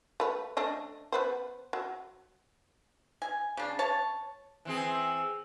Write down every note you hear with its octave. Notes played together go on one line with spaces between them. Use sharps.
A3 B4
A3 D4 D#5
B3 B4 C5
F#3
G#5
C#3 D4
C#5 A5
E3 C4 G#4